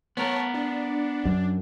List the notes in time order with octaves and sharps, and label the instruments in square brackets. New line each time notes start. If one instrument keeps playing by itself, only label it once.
[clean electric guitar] B3 A#4 [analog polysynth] C#5 A5
[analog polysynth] D4
[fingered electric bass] F#2